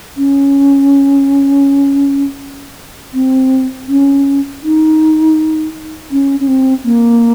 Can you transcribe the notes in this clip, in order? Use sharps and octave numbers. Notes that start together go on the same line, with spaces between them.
C#4
C4
C#4
D#4
C#4
C#4
C4
A#3